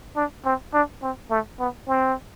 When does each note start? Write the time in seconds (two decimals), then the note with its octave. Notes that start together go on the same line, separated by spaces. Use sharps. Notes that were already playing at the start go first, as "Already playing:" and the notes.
0.16 D4
0.45 C4
0.74 D4
1.02 C4
1.31 A3
1.59 B3
1.88 C4